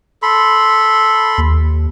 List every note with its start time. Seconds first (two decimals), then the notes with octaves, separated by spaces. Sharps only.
0.22 A4 B5 C6
1.38 D#2